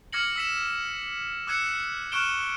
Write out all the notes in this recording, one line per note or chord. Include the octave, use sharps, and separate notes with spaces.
D6 F6 G#6 A#6 C#7 F#7
E6 B6 E7
D6 E6 F#6 G#6 C#7 E7
C#6 F6 F#6 D7 E7 G7